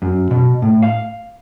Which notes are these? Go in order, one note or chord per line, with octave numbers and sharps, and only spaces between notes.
F#2
B2
A2
F5